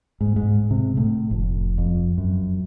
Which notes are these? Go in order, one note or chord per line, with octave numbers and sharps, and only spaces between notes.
G#2
G#2
C3
A2
F1
F2
F#2